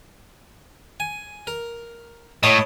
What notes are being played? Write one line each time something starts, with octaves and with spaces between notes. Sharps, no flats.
G#5
A#4
A2 C#5 D#5 A5